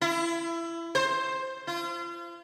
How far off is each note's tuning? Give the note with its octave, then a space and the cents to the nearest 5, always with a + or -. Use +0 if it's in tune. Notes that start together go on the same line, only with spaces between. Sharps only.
E4 +25
C5 +10
F4 -35